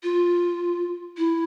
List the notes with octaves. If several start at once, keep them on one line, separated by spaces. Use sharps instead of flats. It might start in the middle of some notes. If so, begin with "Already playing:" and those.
F4
E4